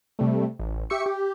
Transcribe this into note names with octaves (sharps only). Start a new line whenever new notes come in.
C3 G3 A3
A1
G4 E5 C#6 C#7
G4